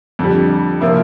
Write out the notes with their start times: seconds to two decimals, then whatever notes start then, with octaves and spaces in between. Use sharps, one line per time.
0.19 F2 D3 G3
0.81 C3 F3 A#3 E4